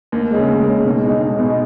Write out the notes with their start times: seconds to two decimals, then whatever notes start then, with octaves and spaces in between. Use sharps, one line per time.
0.12 D#2
0.31 C#3 G#3
0.48 D#2
0.67 C#3 G#3
0.85 B1
1.02 B2 G#3 D#4
1.21 B1
1.39 B2 G#3 D#4